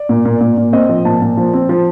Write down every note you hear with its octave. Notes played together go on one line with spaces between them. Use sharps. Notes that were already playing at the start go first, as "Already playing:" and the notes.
Already playing: D5
A#2
A#2
A#2
A#2
C4 D#5
F3
A#2 A5
A#2
F3
C4
F3